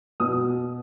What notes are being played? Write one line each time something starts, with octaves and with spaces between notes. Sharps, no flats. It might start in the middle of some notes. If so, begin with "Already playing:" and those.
B2 B3 D#6